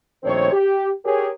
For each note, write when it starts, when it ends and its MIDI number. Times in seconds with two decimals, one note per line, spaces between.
0.24 0.51 34
0.24 0.51 51
0.24 0.51 57
0.24 0.51 60
0.24 0.51 72
0.24 0.51 73
0.52 0.89 67
1.05 1.27 67
1.05 1.27 68
1.05 1.27 70
1.05 1.27 73